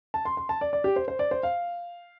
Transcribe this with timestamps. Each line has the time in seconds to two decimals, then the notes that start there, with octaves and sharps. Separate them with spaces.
0.14 A5
0.25 C6
0.37 C6
0.49 A5
0.61 D5
0.73 D5
0.84 G4
0.96 C5
1.08 C5
1.19 D5
1.31 C5
1.43 F5